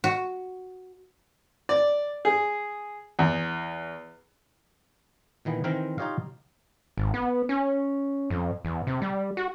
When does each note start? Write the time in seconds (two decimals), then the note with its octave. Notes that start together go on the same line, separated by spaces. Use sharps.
0.04 F#4
1.69 D5
2.25 G#4
3.19 E2
5.45 A#2 D#3 E3 B3
5.64 D#3 E3 C4 A#4 C5
5.98 D#4 F4 G4 C#5 D#5 F5
6.97 G#1
7.14 B3
7.49 C#4
8.30 F2
8.65 E2
8.87 C3
9.02 G3
9.37 F#4